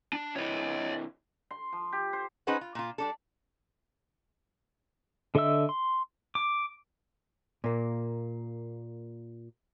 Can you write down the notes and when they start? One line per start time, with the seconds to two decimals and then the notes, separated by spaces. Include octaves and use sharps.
0.13 D4
0.36 C3 E3 C#5 D#5
1.51 C6
1.73 F3
1.93 G4
2.13 C5
2.47 C#4 D#4 G#4 B4 C5 F#5
2.61 F4
2.75 A#2 F4
2.98 G3 D4 A4
5.35 D3 A4 D#5 E5 E6
5.69 C6
6.35 D6
7.64 A#2 A#3